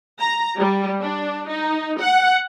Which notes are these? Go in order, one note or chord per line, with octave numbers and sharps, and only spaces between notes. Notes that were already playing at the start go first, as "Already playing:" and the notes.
A#5
G3
D4
D#4
F#5